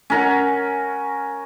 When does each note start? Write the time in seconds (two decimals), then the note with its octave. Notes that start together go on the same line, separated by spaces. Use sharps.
0.10 C#4 A#4 F#5